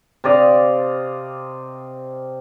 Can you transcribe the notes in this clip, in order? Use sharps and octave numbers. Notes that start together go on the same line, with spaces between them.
C3 D5 D#5 F5